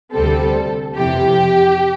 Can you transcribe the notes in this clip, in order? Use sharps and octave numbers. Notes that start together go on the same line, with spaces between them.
D2 C3 G3 C4 A4
F2 C3 E3 G4